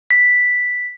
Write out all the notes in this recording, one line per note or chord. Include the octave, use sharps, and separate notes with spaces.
B6